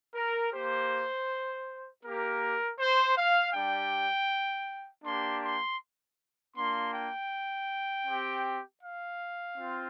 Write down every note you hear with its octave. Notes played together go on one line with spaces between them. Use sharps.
A#4
A#3 G4 C5
A#3 G4 A#4
C5
F5
G3 D4 G4 G5
A#3 D4 G4 C6
C6
A#3 D4 F4 C6
G5
C4 G4
F5
C4 F4